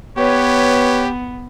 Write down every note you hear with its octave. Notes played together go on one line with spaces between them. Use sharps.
B3 G4 B4 C#5